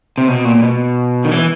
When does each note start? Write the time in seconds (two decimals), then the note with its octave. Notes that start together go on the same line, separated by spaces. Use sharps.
0.18 C3
0.28 B2
0.45 A#2
0.55 A#2
0.62 B2
1.24 D#3
1.32 E3